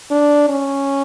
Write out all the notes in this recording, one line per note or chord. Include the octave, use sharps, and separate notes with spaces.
D4
C#4